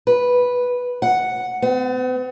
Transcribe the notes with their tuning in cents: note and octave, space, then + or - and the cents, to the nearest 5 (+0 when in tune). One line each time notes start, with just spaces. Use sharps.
B4 -5
F#5 +0
B3 +45